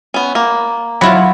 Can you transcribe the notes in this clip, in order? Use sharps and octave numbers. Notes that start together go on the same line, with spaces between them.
B3 C#4
A#3
F#3 E4 F4 B5